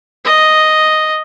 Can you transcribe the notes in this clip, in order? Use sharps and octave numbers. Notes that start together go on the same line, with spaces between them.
D#5